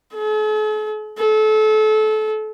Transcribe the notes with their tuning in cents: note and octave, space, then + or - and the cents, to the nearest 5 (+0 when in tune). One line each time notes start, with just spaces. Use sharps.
A4 -45
A4 -30